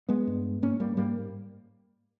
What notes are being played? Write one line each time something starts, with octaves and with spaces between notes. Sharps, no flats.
G#3 B3
G2
G#2 A#3 C#4
G3 A#3
G#2 G3 A#3